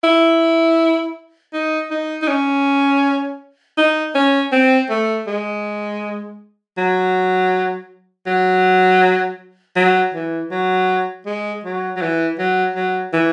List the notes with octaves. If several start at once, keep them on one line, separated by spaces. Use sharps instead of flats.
E4
D#4
D#4
D#4
C#4
D#4
C#4
C4
A3
G#3
F#3
F#3
F#3
E3
F#3
G#3
F#3
F#3
E3
F#3
F#3
E3